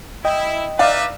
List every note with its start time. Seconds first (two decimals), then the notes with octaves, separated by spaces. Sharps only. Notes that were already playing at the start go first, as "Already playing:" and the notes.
0.25 E4 D#5 G5
0.79 D#4 B4 D5 E5 F5